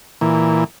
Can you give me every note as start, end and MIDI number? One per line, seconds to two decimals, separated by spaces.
0.21 0.64 46
0.21 0.64 52